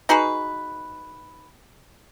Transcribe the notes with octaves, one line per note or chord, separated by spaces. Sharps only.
D#4 F#4 G#4 B4